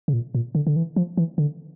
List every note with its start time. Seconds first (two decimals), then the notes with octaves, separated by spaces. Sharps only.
0.08 C#3
0.13 A#2
0.35 A#2
0.55 D3
0.67 D3
0.76 E3
0.96 F3
1.17 E3
1.38 D3